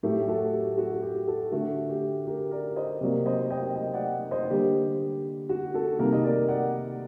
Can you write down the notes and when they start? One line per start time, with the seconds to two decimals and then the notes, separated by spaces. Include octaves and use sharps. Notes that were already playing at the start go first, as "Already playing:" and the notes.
0.03 A2 F#3 A3 G4
0.28 F#4 A4
0.53 G4
0.77 F#4
0.92 F#4
1.02 G4
1.27 F#4 A4
1.52 D3 A3 F#4
1.89 G4
2.27 G4 A#4
2.51 A#4 D5
2.76 C5 D#5
3.01 C3 F#3 A#3 A#4 D5
3.26 C5 D#5
3.50 D#5 G5
3.75 D#5 G5
3.94 D5 F#5
4.31 C5 D#5
4.50 D3 G3 A#3 G4
5.49 F#4
5.74 F#4 A4
5.99 C3 D#3 G3 A#3 G4 A#4
6.13 D#5
6.24 A#4 D5
6.48 D5 F#5